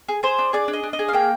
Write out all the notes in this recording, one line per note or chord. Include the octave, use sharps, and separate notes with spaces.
G#4
G#4 C5
D4
G#4 D5
D4
D#5
D4
D#5
G#4
F5
A#3 G5